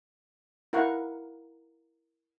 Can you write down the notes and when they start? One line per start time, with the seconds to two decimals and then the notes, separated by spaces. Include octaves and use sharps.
0.73 E4 A#4 F5 F#5 C#6